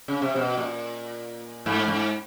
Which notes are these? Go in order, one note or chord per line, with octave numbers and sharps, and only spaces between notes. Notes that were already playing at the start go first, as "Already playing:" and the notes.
C#3
C3
B2
A#2
G#2
G#2